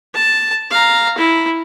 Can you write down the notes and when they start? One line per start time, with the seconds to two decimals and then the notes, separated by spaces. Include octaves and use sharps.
0.14 A5
0.70 F5 A#5
1.17 E4